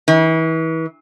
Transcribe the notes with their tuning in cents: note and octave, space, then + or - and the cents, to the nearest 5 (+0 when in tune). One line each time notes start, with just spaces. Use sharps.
E3 -35